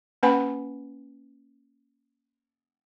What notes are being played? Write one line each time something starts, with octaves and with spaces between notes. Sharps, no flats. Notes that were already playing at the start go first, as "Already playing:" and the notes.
A#3 C#4 B4 F#5 G#5 B5